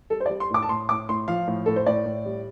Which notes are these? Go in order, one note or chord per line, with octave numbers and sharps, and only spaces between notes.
G3 A4
C5
D5
G3
C6
A2 D6
A5
A2 C6
A2 D6
A2 C6
F3 F5
A2
A2 A4
C5
A2 D5
A2
G3